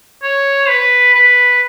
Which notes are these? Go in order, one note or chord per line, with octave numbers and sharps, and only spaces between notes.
C#5
B4
B4